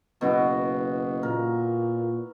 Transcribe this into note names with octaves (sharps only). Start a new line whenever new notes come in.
F#1 B2 E4 F#4
A#2 A#4